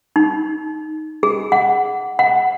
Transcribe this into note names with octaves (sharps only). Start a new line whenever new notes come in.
D#4
G#4
F#5
F#5